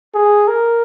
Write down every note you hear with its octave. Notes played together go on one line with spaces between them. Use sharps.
G#4
A#4